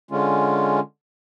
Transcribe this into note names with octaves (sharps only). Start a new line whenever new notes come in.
D3 G#3 C#4 F4